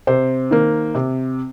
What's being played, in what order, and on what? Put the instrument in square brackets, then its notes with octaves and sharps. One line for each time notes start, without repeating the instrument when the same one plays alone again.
[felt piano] C3 C5
D#3 A#3
C3